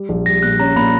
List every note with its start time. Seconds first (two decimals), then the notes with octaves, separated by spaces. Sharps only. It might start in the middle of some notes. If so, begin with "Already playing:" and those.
Already playing: G3
0.09 A#1
0.26 G3 A#6
0.43 A#2 F#6
0.60 C#4 A#5
0.76 A#2 B5